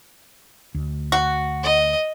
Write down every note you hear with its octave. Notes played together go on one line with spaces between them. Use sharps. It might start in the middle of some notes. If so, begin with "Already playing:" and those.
D2
F#4
D#5